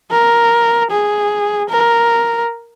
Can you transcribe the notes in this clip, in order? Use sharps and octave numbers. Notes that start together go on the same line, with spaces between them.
A#4
G#4
A#4